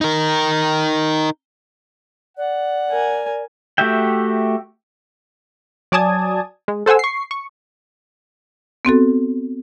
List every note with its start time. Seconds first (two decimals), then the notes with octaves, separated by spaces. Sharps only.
0.01 D#4 A#4
2.37 D5 F#5
2.89 A#4 G#5
3.78 A3 F#4 G4 E5 G5
5.92 F#3 D5 G#5 A5 D#6 G#6
6.68 G#3
6.86 A4 C5 F#5 G#5 E6
6.99 C#6 C7
7.31 C#6
8.85 B3 C4 F#4 A4